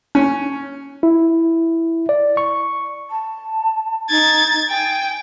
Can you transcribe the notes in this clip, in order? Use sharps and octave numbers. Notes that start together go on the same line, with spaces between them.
C#4
E4
D5
C#6
A5
D#4 G#6 A6
G5 G#5